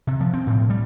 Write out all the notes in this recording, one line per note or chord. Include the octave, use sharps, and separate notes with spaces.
C3
F3
C4
A2
G3